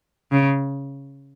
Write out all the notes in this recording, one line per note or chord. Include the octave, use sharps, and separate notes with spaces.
C#3